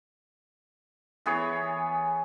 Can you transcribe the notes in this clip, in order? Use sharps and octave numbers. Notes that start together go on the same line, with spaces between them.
E3 B3 G#4 C#5